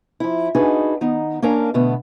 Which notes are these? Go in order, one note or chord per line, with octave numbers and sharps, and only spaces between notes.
F3 E4
D4 D#4 F#4 G#4 B4
D#3 B3 D#4
A#3 C#4 D4 A#4 F5
B2 D3 A3 B3